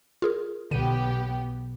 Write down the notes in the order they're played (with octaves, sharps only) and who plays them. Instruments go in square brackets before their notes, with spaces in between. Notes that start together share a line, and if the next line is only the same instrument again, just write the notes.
[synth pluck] F4 G#4 A#4
[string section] B1 B3 G4 [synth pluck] D3 D#7